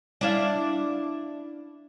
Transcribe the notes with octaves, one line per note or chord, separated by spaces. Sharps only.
D4 E4 F5